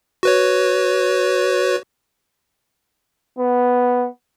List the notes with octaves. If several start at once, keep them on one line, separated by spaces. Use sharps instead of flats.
F#4 B4 C#5
B3